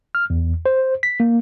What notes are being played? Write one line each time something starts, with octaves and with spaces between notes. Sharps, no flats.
F6
E2
C5
B6
A#3